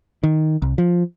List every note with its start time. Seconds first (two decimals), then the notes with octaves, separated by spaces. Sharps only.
0.23 D#3
0.62 C2
0.78 F3